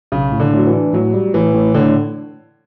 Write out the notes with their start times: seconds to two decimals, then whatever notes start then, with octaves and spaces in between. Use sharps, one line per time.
0.12 B1 C#3
0.32 A2
0.40 D3
0.53 A2 F#3
0.67 E3
0.73 D4
0.93 A2 F#3
1.14 G3
1.34 A2 E3
1.55 A2
1.74 A2 D3